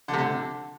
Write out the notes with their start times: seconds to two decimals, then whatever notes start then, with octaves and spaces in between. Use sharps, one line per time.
0.08 D3
0.13 C3
0.18 D3